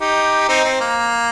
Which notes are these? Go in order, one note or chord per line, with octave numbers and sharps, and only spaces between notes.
D#4 G4
C4 D#4
C4
A#3